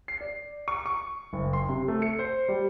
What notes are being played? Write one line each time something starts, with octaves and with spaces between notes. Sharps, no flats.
C7
D5
C#6
C#6
F#1
C6
C3
A3
C#7
C5
G3